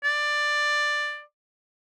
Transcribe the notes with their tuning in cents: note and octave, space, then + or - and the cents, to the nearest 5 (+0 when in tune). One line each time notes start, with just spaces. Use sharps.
D5 +10